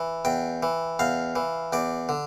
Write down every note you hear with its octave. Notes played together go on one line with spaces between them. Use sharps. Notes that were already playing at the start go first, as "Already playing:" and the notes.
Already playing: E3
E2 G5
E3
E2 F5
E3
E2 D5
D3